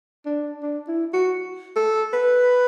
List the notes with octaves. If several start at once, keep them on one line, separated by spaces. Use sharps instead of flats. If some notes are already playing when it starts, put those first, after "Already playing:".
D4
D4
E4
F#4
A4
B4